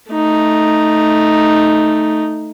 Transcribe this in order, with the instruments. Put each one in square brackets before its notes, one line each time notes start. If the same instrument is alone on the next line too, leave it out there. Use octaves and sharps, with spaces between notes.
[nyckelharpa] A3 D#4